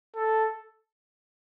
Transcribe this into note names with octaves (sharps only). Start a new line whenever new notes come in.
A4